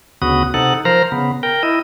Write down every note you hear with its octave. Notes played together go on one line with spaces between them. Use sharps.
D2 C#3 B3 F#4 D#6
C3 D#4 A4 F#5
F3 A#4 C5 A#5
C#3 B3
A#4 G5
E4 D#5